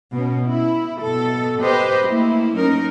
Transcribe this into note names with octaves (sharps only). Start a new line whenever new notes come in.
B2 C#4
E4
B2 A4
G4 B4 C5 D#5
A3 A#3 E4
F#3 C#4 D#4 A#4